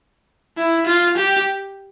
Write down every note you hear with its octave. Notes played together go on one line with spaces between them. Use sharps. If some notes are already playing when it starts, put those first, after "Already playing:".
E4
F4
G4